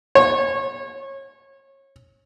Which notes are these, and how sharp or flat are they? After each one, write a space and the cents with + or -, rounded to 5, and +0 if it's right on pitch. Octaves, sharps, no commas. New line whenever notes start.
C#5 -30